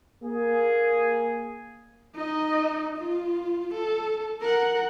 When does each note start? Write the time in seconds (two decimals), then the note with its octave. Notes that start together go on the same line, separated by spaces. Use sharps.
0.24 A#3 G#4
2.16 D#4 D#5
2.98 F4
3.74 A4
4.41 A#4 F#5